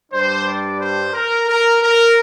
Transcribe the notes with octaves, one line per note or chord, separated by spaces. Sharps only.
G2 G3 D4 C5
D5
C5
A#4
A#4
A#4